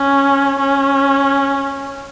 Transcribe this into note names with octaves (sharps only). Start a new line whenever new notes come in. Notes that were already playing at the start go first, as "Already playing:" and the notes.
Already playing: C#4
C#4